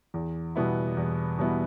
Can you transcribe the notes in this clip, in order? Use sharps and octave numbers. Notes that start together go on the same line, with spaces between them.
E2
B2 G3 B3 E4
E2
B2 G3 B3 E4